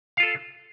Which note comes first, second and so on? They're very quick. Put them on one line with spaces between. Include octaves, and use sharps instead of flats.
F5 F4 A4